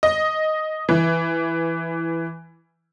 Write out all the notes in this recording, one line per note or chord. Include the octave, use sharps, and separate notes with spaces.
D#5
E3